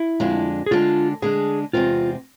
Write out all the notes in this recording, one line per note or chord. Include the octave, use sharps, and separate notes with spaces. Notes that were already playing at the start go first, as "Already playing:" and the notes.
Already playing: E4
F2 D3 G#3 D4
G#4
D3 G#3 D4 F4
D3 G#3 D4 G#4
E2 C3 G#3 C4 F4